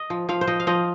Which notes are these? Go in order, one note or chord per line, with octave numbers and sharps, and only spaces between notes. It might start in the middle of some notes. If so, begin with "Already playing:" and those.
Already playing: D#5
F3
F3 F5
C5
F3 D#5
F5
F3 D#5